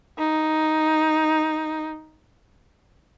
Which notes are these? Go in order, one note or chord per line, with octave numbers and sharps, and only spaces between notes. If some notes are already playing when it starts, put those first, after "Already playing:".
D#4